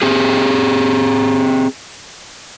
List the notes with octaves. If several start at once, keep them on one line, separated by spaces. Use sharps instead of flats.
C4 G4 G#4